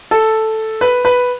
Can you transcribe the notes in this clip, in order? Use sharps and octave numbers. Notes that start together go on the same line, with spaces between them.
A4
B4
B4